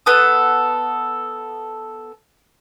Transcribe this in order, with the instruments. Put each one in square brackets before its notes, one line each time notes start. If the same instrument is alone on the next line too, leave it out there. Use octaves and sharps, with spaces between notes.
[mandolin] B3 A4 D#6